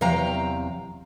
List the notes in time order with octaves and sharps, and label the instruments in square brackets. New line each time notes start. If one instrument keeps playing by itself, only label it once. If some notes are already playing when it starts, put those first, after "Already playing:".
[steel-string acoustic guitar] E2 C3 F#3 F5 G5 A#5